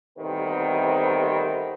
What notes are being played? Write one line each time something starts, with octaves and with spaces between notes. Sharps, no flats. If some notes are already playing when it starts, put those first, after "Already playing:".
A1 C3 D#3 G3 B3 C4